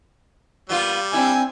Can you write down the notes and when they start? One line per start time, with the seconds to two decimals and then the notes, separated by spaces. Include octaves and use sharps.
0.69 A#2 G3 B3 F4
1.13 C4 D4 E4 G#5